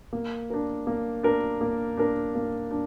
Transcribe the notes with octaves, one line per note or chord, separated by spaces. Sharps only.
A#3
D4 A#4
A#3
D4 A#4
A#3
D4 A#4
A#3
D4